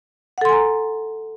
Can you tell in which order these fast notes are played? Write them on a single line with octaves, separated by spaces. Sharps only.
F#5 A4 C6 G#5 A#5